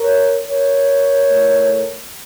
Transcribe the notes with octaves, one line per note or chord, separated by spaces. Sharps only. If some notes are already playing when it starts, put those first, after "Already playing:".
Already playing: A#4 C#5
A#4 C#5
A2 A3